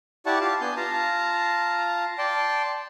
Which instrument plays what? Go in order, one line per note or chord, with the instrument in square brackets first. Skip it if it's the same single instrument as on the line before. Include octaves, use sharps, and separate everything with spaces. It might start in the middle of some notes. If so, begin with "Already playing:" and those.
[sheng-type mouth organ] E4 G4 D5 F#5 A5 C#6
F4 G4 F5 A5
B3 D4 G#5 G6
F4 F5 A5 A#5
D5 G5 A5 C6